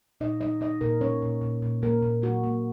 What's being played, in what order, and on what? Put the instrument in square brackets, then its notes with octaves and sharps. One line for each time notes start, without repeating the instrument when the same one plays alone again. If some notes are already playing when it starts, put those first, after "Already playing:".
[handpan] A#2 D#4 D#5
D#4 D#5
D#4 D#5
A#2 A#3 A#4
A#2 C#4 C#5
A#2
A#2
A#2
A#2 A#3 A#4
A#2
A#2 F#4
A#3